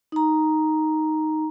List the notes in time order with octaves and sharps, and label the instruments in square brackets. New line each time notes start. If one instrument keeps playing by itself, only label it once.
[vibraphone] D#4 A#5